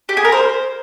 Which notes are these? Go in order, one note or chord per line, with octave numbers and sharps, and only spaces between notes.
G4
G#4
A#4
C5